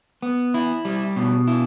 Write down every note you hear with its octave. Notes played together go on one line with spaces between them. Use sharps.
B3
E4
G3
B2
E4